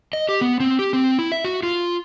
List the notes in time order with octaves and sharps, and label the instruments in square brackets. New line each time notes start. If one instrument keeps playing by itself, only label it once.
[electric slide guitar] D#5
G4
B3
C4
G4
C4
E4
E5
F#4
F4